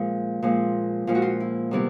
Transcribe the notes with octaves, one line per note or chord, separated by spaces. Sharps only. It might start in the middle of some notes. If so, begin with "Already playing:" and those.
Already playing: A#2 F3 G#3
A#2 F3 G#3
A#2 F3 G#3 F4
F#4
F4
E4
C3 D#3 G3 B3 E4